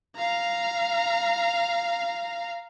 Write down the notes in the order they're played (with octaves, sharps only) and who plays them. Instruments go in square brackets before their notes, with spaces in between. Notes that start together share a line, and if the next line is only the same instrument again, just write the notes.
[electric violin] F5 A#5